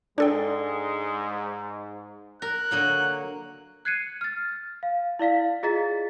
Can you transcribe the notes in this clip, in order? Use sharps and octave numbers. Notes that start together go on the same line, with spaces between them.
G#2 G#3 D4 A4 D5 G5
A#4 F#6
D3 F#3 A#3
F#6 G#6 C7 C#7 D#7
F6 A6
F5
E4 D5 F5 B6
F4 G#4 D#5 A#5 A6 B6